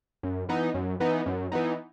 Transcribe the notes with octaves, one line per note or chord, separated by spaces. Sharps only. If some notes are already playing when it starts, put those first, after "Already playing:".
F#2
E3 B3 D#4
F#2
E3 B3 D#4
F#2
E3 B3 D#4